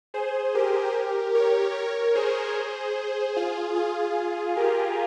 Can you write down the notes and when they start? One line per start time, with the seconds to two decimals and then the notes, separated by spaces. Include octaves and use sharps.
0.14 G#4 C5
0.55 G4 A#4
1.35 A#4 C#5
1.75 A#4 C#5
2.15 G#4 C5
3.36 F4 G#4
3.76 F4 G#4
4.57 G4 A#4